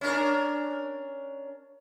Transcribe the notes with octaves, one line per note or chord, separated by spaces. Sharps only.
C#4 D4 A#4